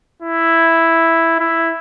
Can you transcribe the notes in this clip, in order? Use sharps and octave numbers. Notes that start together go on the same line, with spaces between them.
E4
E4